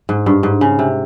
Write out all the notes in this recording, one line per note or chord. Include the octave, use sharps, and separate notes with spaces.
G#2
G2
G#2
C#3
C3